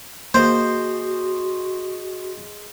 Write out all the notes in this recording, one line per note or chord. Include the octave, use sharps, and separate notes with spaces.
A#3 F#4 G#4 C5 D#5 C6